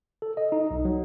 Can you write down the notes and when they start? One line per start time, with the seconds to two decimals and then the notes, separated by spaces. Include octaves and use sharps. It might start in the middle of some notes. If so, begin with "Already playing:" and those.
0.22 A4
0.37 D#5
0.52 D#4
0.71 B1
0.85 F#3